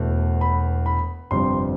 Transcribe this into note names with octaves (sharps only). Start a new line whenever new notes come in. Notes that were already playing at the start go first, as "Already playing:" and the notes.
Already playing: E1 E2 B2 A3
B5
B5
G1 F2 C3 G3 C6